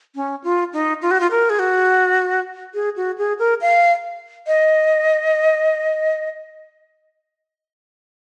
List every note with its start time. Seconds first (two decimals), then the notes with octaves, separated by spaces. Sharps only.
0.15 C#4
0.44 F4
0.73 D#4
1.02 F4
1.11 F#4
1.20 F4
1.31 A#4
1.50 G#4
1.59 F#4
2.74 G#4
2.96 F#4
3.18 G#4
3.39 A#4
3.61 F5
4.47 D#5